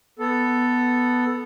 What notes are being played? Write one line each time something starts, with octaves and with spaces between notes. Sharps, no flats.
B3 A4